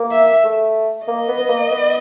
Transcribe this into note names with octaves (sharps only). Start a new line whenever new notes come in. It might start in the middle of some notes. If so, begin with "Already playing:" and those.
Already playing: A#3
E5
A3
A#3 D#5
B3
B3
A#3
B3